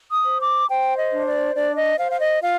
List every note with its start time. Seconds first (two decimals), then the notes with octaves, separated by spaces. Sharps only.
0.11 D#6
0.25 C5
0.39 D6
0.68 C5 G5
0.96 D#5
1.12 D4
1.26 D5
1.55 D4 D5
1.76 D#5
1.97 C5 F5
2.11 F5
2.19 D#5
2.42 F4 F5